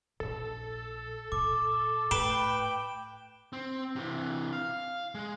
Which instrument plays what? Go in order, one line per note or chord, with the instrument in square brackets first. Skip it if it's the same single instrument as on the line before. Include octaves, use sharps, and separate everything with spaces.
[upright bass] A#1 [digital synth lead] A4
[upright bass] A#2 [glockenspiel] D6
[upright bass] A2 [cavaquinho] B4 [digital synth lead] G5 [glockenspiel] D7 E7 G7
[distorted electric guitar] C4
C3 E3
F5
G#3